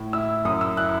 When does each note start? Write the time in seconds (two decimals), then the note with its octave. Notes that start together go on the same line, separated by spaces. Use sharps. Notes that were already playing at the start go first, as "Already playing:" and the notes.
Already playing: A2
0.13 E4 E6
0.45 F#2 D#6
0.61 E6
0.77 E4 F#6